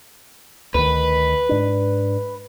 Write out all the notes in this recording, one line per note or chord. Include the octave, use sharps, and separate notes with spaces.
D2 D#3 B4
G#2 D4